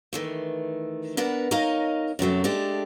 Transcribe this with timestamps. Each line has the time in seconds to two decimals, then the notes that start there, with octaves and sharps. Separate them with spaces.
0.13 D#3 E3 A3
1.17 B3 D4 A#4 B4 F#5
1.51 D#4 A#4 C#5 D#5 F5
2.19 F#2 C3 F#3 A3
2.44 G#3 A3 D4 G4